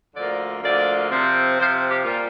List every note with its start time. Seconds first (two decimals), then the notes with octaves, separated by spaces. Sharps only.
0.15 D2 D3 F3 A#3 D5
0.61 D2 D3 F3 A#3 D5
1.09 C3 F3 C4
1.57 C3 F3 C4 C5
1.88 G4
2.03 A#2 G3 A#3 F4